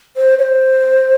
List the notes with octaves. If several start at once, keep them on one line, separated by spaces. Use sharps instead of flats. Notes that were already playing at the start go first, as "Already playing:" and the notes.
C5
C#5
C5